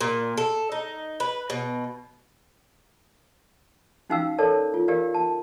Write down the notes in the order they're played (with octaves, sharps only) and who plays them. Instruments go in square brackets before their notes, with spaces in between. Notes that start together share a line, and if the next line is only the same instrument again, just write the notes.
[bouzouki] A#2
A4
D#4
B4
B2
[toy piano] C#4 D#4 F#4 F5 G5 E6
A4 A#4 C#5 D5 A5
F4
G4 A#4 D5 F5
A5